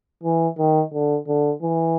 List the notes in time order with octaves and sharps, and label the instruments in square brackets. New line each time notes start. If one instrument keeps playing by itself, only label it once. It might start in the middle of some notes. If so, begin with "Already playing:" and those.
[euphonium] E3
D#3
D3
D3
E3